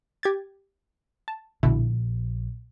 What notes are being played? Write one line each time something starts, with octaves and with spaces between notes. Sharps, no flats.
G4 G#6 A6
A5
A#1 B2 D3 E4